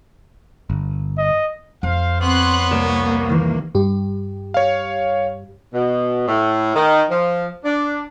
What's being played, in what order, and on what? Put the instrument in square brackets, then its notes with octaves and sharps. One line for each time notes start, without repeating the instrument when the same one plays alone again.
[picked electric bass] G1
[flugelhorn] D#5
[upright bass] F2 [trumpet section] C5 F5
[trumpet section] B3 C#5 [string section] C4 C6 F#6
[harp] C2 D5 E7 [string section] A#3
[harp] D#3 E3
[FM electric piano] G2 G4
[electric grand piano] C#5 F5
[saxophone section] B2
A2
D#3
F3
D4